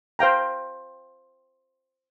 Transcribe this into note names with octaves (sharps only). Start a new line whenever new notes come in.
C5 F5 G5 A#5